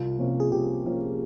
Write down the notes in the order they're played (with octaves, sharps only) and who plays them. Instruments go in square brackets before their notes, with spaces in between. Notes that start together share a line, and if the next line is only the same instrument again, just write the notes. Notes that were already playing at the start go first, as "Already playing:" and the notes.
Already playing: [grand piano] C2 [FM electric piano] F4
[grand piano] C3 F3 A#3 C#4
[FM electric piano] G#4
[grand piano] C2 [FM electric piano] G4
[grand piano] C3 F3 A#3 C#4